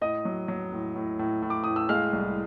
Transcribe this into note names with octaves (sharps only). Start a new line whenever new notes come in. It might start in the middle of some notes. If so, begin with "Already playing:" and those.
A2 D#5 D#6
F#3
F#3
A2
A2
A2
A2
D6
A2 D#6
E6
G#3 F5 F6
C2